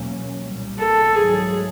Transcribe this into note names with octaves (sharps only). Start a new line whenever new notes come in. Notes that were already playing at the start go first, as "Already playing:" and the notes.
Already playing: E2 B2 F#3 A#3 C#4
C2 A#2 G3
A4
G#2 D#3 F#3 A3 G#4